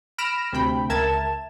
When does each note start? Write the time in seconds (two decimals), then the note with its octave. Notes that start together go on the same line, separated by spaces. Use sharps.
0.18 B5 F6 A#6 D7 E7
0.52 D2 C3 G5 B5
0.90 C#2 A#4 E5 A5 G#6 E7